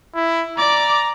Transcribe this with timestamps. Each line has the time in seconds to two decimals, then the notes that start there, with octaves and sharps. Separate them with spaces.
0.15 E4
0.57 D5 A#5 D6